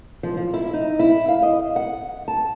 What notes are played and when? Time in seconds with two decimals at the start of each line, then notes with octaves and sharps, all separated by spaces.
0.23 F3
0.37 F3
0.54 E4
0.74 D#4
0.99 E4
1.28 F5
1.42 D#5
1.76 F#5
2.28 A5